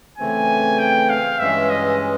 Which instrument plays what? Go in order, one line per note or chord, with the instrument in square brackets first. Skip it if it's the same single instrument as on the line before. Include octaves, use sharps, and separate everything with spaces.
[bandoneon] C#3 E3 A3 C4 [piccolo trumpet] G#5
[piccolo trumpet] G5
F5
[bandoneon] G2 E3 G#3 C#4 [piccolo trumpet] E5
[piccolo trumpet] D#5